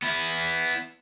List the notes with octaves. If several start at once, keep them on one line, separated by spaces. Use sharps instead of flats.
B3 E4